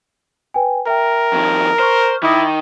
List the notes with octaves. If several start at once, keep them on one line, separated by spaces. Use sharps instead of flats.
B4 G5 G#5
A#4 E5 G5
F2 D#3
C5 C#6 F6
D#3 E4 D6 D#6 A#6